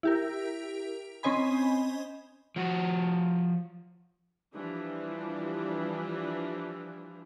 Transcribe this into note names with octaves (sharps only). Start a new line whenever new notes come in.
E4 G4 A#4
C4 C#4 C5 D#5 G#5 B5
F3 F#4
E3 F3 G3 D4